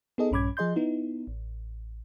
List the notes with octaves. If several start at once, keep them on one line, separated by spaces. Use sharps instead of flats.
B3 D#4 G#4 A4 D#5
A#1 G2 C#4 B5 D6 G#6
F3 G#4 D#5 C6 G6
B3 D#4 E4
A1